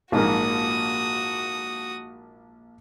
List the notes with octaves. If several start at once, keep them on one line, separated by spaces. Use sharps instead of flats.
A#1 G#2 A#3 F#4 D#6